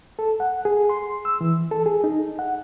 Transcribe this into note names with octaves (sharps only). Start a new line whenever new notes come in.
A4
F#5
G#4
C6
E6
E3
A4
G#4
D#4
F#5